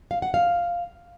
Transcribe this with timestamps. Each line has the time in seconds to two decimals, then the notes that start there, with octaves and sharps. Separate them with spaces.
0.11 F5
0.22 F#5
0.34 F5